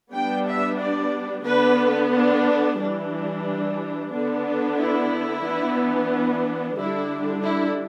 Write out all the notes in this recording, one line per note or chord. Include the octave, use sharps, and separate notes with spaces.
G3 B3 D4 G5
E5
D5
D3 B3 D4 B4
D4
E3 G3 D4
D3 B3 D4
E4
E3 B3 D4
D3 G3 D4 E4
E4